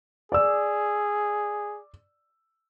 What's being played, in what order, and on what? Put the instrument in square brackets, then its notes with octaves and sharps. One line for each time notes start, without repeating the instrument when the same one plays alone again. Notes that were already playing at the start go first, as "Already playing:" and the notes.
[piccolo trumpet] G#4 [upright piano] D5 E6